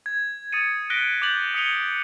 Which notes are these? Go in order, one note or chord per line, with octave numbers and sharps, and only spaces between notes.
G#6
D#6 A6 C#7 D#7
F#6 A#6 B6 D7 G7
D6 F#6 G6 A6 F#7
D#6 B6 C#7 D#7 F7 G7